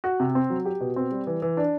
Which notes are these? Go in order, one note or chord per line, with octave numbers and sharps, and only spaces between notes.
F#4
C3
C4
F#3
G4
B2
C4
G3
E3
E3
D4